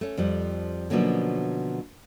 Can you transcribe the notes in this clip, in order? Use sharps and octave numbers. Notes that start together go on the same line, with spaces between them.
A3 C#4
F2 F3 G3
B2 D3 F3 F#3 A#3 C#4